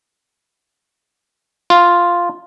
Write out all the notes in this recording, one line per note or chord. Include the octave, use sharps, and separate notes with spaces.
F4